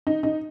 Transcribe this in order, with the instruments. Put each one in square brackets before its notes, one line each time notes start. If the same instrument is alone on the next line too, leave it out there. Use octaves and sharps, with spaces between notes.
[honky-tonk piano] D#4
D#4